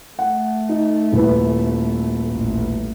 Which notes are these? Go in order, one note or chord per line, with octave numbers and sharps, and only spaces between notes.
A3 F#5
D#4
D#1 E4 B4
A1